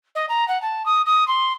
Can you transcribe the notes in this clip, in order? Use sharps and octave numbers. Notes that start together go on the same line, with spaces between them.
D#5
A#5
F#5
A5
D#6
D#6
C6